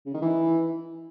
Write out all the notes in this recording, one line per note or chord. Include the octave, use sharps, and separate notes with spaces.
C#3
D#3
E3